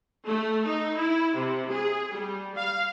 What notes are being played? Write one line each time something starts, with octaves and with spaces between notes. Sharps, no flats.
A3
D#4
E4
C3
G#4
G3
F5